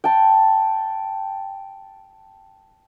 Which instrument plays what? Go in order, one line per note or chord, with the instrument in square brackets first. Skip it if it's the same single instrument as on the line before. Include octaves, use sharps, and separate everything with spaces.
[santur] G5 A5